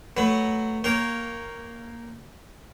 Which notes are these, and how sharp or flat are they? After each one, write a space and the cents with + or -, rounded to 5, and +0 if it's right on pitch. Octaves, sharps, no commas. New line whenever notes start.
F#3 +5 A3 +10 B4 +0
A#3 +0 C#5 +0 G5 -20